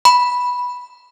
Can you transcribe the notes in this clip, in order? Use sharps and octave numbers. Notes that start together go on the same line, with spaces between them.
B5